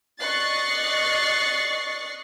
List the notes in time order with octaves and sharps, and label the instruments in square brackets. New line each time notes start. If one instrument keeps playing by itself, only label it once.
[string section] D5 D#5 C#6 F#6 A6 C7